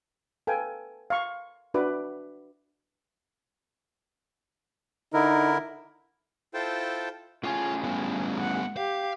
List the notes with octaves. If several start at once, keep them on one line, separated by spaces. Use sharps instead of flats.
A4 B4 F5 G5 G#5
F5 C#6
D4 F#4 B4 E5 D6
D3 D#4 E4 A#4
E4 F4 A4 C5 G5 A5
A2 C#4 F4 G#4
G3 B3
F#5
G4 F5